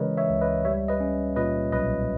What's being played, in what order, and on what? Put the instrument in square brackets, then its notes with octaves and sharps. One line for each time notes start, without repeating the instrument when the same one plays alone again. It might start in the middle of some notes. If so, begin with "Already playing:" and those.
Already playing: [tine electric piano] C#3 E3 G#3 A#4 B4 C#5 D#5
C#5 E5
C#2
B4 D#5
G3 C#5 E5
B4 D#5
C#4
A#2 B4 D#5
B1 B4 D#5